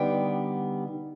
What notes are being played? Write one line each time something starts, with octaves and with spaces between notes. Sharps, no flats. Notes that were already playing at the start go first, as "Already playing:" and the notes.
Already playing: D3 G3 B3 D#4 G5